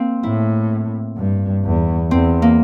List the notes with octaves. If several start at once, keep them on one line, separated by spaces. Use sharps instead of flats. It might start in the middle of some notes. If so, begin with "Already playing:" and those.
Already playing: A#3 C4
A2 E4
G2
E2
E2 C4
A#3